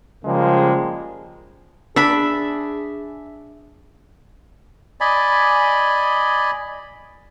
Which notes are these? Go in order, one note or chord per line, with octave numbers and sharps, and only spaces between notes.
C#3 F3 G3 G#3 A#3
D4 G#4 E5 B5
D5 D#5 G#5 B5